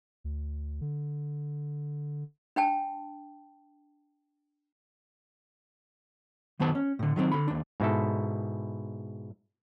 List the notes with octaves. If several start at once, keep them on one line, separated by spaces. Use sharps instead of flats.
D2
D3
D4 G5 A5
F#2 D#3 B3 C5 A5
C#4
A2 D3
D#3 F#3 A3 C4
D3 B5
D#2 D4
G#2 B2 E4 A4